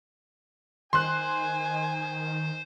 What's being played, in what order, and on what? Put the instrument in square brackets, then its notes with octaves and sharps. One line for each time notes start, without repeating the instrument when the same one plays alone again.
[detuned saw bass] D#3 [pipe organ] C5 [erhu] G#5 [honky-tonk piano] C6 F#6